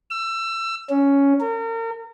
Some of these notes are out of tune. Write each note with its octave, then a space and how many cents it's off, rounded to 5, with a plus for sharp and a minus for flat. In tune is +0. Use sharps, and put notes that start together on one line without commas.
E6 +25
C#4 +5
A#4 -35